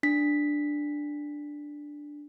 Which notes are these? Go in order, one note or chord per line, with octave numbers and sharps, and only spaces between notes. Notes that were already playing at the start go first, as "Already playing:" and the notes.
D4 B6